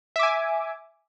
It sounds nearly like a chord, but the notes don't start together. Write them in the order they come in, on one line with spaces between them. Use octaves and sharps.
E5 D6 G#5